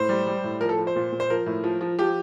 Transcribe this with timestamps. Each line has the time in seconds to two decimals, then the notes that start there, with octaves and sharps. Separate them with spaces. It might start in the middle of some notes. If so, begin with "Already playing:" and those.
Already playing: A2 C5
0.09 G3
0.27 G3
0.44 A2
0.60 F3 A#4
0.69 A4
0.78 F3
0.87 C5
0.96 A#2
1.12 A#2
1.20 C5
1.30 F3 A#4
1.46 A2
1.64 F3
1.81 F3
1.99 F3 G4